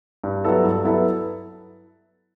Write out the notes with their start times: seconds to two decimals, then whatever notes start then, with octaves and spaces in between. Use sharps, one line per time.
0.24 G2
0.44 F#3 B3 E4 A4
0.64 G2
0.84 F#3 B3 E4 A4